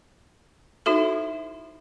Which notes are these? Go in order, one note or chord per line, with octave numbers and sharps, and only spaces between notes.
D#4 E4 F#4 A4 C5